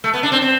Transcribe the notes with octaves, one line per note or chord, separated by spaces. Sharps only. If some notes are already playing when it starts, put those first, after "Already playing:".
A3
B3
D4
C4
C4